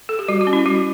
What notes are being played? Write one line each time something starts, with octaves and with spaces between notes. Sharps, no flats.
A4
G4
G3 F#4
F#4
C#4
E4
G3 F#4